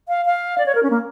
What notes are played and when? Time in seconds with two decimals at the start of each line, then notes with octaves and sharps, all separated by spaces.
0.08 F5
0.25 F5
0.58 D5
0.66 C#5
0.75 A#4
0.83 C#4
0.90 A#3